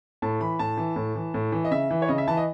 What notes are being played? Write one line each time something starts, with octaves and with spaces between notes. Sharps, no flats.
A2 A5
E3 B5
A2 A5
E3
A2
E3
A2
E3
D#5
C#3 E5
E3
C#5
C#3 D#5
E5
E3 A5
D#5